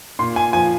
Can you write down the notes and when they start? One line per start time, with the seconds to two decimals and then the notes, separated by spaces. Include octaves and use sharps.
0.19 A#2 C6
0.36 G#5
0.53 F3 G#5